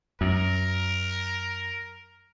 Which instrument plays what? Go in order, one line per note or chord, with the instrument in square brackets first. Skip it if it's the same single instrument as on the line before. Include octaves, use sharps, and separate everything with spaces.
[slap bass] F#2 [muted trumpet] A#4